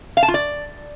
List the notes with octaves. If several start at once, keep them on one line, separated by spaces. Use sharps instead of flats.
F5
A5
F4
D5